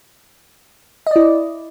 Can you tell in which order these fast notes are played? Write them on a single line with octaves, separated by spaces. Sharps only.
D#5 D5 E4